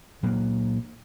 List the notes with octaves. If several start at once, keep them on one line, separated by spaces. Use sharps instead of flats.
A#2 F#3 A#3